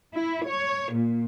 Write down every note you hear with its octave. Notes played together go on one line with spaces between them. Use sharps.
E4
C#5
A#2